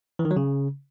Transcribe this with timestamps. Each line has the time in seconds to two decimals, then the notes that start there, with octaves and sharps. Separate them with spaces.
0.19 E3
0.25 D#3
0.31 F#3
0.36 C#3